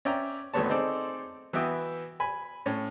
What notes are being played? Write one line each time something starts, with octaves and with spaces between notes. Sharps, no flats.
C#4 D5 E5 G5 A#5
G#1 D2 A3 B3 C#5 A5
C4 D#4 G#4 A4 C5 D5
E3 B3 F#4 E5 G5 D#6
G#5 B5
A2 C#4